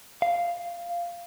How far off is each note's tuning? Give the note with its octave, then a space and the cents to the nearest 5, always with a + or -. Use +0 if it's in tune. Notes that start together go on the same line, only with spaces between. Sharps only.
F5 -10